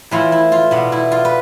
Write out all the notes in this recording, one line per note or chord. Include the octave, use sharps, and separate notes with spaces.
A2 E3 A3 E4 F4
E4
F4
B2 B3 D4
E4
F4
B4